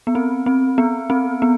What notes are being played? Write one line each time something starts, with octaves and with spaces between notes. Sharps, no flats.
B3
C4
C4
B3
C4
B3